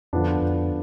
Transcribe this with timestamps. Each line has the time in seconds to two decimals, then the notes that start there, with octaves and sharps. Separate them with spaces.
0.13 F2 D3 F3 B3 D4
0.42 F2